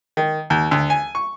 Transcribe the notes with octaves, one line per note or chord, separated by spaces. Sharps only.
D#3
D#2
D2
G#5
C#6